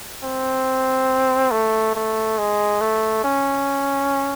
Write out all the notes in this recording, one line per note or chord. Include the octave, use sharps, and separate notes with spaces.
C4
A3
A3
G#3
A3
C#4